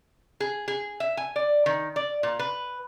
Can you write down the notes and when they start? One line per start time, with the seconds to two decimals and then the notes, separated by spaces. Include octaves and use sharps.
0.40 G#4
0.68 G#4
1.00 E5
1.17 G#5
1.36 D5
1.66 D#3
1.96 D5
2.23 A#2
2.39 B4